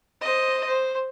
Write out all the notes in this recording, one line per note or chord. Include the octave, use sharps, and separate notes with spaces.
C5 D#5
C5